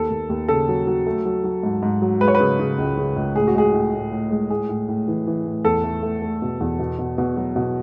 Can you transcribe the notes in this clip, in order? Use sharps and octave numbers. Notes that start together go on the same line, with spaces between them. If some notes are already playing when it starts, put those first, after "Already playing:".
Already playing: D#2 A4
D#2
D#2
C#3 A4
F#3
F#3
A3
F#3
F#3
G#2
G#2
F#3
G#3 B4
C#5
B4
C#3
C#3
C#2
C#3
C#2
A2 G#4
F#4
G#3 G#4
A2
A2
A2
G#3
A2 G#4
A2
A2
E3
E3
A2
E2 A4
A3
A3
A3
B2
E2
B2
B2
B2
F#3
B2